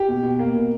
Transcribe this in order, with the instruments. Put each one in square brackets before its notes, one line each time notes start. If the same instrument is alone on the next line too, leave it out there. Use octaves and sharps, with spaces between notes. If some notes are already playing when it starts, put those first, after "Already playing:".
Already playing: [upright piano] G4
B2
B2
A#3
B2